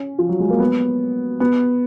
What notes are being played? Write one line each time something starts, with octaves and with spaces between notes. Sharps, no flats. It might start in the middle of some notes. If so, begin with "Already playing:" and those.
Already playing: C#4
F3
F#3
G#3
A#3
B3
B3